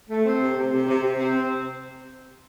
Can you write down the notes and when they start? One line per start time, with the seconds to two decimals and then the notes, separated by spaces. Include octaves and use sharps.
0.09 A3
0.25 C4
0.41 C3
0.56 C3
0.72 C3
0.88 C3
1.03 C3
1.18 C4